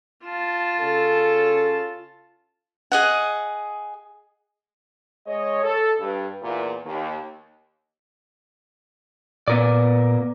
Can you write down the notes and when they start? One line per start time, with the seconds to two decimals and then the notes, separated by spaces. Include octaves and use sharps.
0.24 F4 A5
0.80 C#3 C#4 A4
2.92 G#4 D#5 F#5
5.27 G#3 C#5 D#5
5.63 A4
6.00 G2
6.42 E2 A#2
6.86 D#2
9.48 A#2 B3 A#4 D5